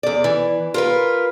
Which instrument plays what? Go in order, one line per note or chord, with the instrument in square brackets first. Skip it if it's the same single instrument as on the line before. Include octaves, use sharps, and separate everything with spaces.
[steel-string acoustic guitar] E2 D5
E3
F4 A#4 B4